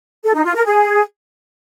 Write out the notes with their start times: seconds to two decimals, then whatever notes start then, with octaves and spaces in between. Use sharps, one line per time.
0.25 A4
0.35 D#4
0.45 F4
0.55 A#4
0.65 G#4